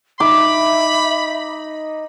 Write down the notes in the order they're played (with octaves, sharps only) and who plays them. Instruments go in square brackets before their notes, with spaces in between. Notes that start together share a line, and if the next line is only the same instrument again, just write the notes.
[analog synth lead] D#4 [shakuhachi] E5 [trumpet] B5 [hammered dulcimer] D6